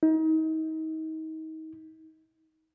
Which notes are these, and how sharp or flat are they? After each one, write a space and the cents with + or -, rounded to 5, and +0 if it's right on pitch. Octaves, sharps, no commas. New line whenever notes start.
D#4 +30